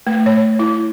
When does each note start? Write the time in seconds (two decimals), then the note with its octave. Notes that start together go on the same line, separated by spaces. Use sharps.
0.07 A3
0.26 C#5
0.59 E4